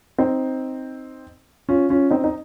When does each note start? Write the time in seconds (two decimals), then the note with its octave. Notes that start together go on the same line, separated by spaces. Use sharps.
0.18 C4 D#4
1.69 C#4 F4
1.90 C#4 F4
2.11 C4 D#4
2.24 D#4